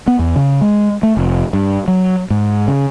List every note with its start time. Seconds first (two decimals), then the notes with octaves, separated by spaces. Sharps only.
0.08 B3
0.19 E2
0.36 C#3
0.61 G#3
1.03 A3
1.17 F1
1.53 G2
1.88 F#3
2.30 G#2
2.68 C#3